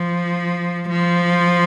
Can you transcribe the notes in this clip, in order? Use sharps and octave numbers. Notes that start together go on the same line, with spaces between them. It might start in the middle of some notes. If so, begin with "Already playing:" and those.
Already playing: F3
F3